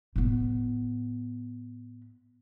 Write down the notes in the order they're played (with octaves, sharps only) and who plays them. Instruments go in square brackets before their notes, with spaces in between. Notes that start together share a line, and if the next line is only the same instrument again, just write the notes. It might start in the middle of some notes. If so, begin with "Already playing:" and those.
[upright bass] A2 B3